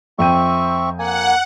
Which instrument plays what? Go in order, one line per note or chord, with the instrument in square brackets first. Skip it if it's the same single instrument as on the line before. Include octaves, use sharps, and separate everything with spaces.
[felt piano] F2 G5 D#7 [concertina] C4 E5 C#6
[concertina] A#3 G#5 [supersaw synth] F#5